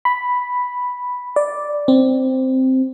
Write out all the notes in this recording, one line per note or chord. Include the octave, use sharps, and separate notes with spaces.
B5
D5
C4